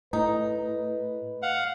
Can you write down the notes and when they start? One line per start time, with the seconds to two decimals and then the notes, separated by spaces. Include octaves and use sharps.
0.13 A2 D#4 B4
1.42 F5 F#5